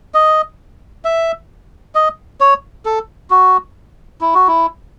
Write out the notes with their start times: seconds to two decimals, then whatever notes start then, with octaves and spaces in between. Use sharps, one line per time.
0.14 D#5
1.05 E5
1.95 D#5
2.40 C#5
2.85 A4
3.30 F#4
4.21 E4
4.35 F#4
4.47 E4